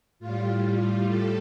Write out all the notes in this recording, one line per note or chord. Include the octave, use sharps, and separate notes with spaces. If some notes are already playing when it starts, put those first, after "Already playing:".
A2 G3 F4
F4
A4